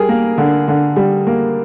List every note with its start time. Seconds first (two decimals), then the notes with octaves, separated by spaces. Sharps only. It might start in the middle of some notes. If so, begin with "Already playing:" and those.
Already playing: G3 G#4 A#4
0.09 A#3
0.38 D3
0.68 D3
0.96 G3
1.27 A#3